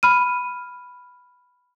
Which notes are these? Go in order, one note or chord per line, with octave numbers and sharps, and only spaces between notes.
B5 F6 D#7